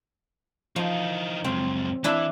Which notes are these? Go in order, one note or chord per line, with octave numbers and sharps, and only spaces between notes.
E3 F3 D#4
C#2 F#2 C4
E3 D4 E4 E5